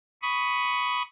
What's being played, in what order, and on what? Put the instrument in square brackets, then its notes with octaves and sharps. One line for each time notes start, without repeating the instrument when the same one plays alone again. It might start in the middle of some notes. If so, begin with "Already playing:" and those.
[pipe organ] B5 C#6 D#6